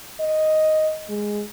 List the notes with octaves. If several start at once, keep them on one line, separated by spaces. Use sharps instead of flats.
D#5
G#3